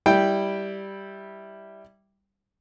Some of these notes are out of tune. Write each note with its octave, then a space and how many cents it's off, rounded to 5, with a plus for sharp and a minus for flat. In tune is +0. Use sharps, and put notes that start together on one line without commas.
G3 +0 E4 -10 G5 +0